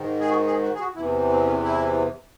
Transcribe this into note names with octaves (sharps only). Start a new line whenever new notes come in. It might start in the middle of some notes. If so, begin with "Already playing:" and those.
Already playing: G#2 D#3
G#4
F#4
G#4
F#4
G#4
F#4
E2 C3 E3 E4
C4
C#4
E4